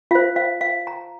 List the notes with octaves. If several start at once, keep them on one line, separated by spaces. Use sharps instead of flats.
F4 C5 F5
F5
F5
A#5